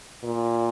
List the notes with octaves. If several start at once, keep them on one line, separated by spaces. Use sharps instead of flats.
A#2